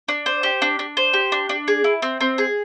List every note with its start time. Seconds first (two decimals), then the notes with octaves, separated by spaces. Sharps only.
0.08 D4
0.26 C5
0.43 G4
0.62 D4
0.79 D4
0.97 C5
1.13 G4
1.32 D4
1.49 D4
1.68 G#4
1.84 E4
2.02 C4
2.21 C4
2.38 G#4